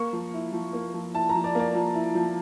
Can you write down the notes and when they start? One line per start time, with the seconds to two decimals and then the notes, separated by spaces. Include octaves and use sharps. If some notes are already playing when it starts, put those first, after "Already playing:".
Already playing: A#3 C#6
0.13 F3
0.34 E4
0.53 F3
0.73 A#3
0.94 F3
1.14 E4 A5
1.29 A#5
1.35 F3
1.44 D5
1.55 A#3 D5
1.75 F3
1.95 E4
2.15 F3